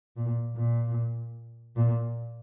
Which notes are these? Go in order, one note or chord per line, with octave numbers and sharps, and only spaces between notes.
A#2
A#2
A#2